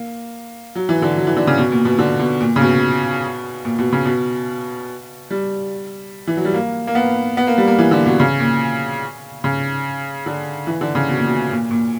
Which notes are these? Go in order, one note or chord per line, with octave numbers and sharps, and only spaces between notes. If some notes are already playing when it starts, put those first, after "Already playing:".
Already playing: A#3
F#3
E3
D3
F#3
E3
D3
C#3
B2
A#2
B2
D3
B2
A#2
C#3
B2
A#2
B2
C#3
B2
G3
E3
F#3
G3
A#3
A#3
B3
B3
A#3
G3
A#3
E3
D3
B2
C#3
A#2
C#3
D3
E3
D3
C#3
B2
A#2
B2
A#2
A#2